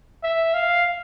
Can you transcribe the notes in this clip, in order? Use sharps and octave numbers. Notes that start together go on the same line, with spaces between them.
E5
F5